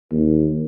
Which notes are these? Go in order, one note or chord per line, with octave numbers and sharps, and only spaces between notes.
D#2